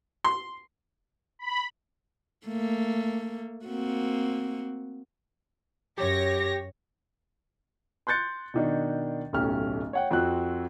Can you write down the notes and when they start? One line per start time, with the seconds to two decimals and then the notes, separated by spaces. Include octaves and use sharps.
0.24 C6
1.39 B5
2.46 A3 A#3
3.66 A#3 C4 F#4
5.98 F#2 G4 C#5 A#6
8.07 C6 F#6 G6 A6 C#7
8.54 B2 D#3 D4
9.33 D1 B1 A3 C#4 G4 F6
9.93 C#5 F#5 G5
10.11 F2 C4 F#4 F#6